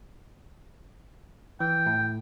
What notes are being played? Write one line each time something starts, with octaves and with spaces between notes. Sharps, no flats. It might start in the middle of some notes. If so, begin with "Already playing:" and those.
E3 G5
A2